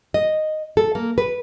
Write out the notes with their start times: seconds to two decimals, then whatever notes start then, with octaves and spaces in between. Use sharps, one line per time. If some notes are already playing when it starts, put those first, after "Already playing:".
0.14 D#5
0.77 A4
0.95 A#3
1.18 B4